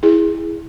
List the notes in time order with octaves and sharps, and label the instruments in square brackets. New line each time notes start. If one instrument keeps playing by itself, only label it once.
[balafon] E4 G#4